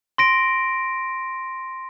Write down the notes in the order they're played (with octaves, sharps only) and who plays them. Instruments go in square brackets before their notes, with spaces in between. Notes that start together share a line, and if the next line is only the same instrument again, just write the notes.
[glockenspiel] C6 A#6 D7